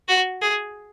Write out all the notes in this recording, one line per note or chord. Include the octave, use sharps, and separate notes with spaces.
F#4
G#4